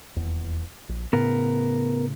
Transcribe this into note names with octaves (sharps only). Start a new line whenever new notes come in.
D#1 E2
A#1
A2 C#3 B3 A#4